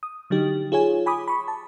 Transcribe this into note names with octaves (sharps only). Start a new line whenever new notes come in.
D#6
D3 F#3 D#4 G4
F4 G#4 C#5 G#5
G#5 B5 D6 D#6
B5 C#6
A5